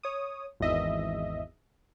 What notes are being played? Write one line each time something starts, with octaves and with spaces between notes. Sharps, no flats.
C#5 D#6
G#1 E2 D#5 E5